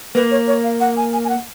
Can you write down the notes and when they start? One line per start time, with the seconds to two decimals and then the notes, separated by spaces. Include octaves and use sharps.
0.15 A#3 B4
0.31 C#5
0.47 C#5
0.64 F5
0.80 F#5
0.97 G#5
1.13 G#5
1.24 G#5
1.29 F#5